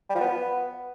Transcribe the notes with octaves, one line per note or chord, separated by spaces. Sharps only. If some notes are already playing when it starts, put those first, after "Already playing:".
G3
F3
B3